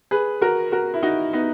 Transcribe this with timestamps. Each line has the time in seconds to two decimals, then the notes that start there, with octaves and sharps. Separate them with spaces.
0.11 G#4 B4
0.41 F#4 A#4
0.72 F#4 A#4
0.94 E4
1.03 D#4 F#4
1.33 B3 D#4